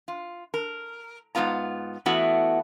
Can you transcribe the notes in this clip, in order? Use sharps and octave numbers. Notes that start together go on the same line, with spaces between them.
F4
A#4
G#2 B2 B3 F4 A#5
E2 A3 B3 E4 F#4